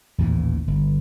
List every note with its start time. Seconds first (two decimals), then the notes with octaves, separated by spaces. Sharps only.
0.18 A1 D#2 A#2 E3
0.68 G1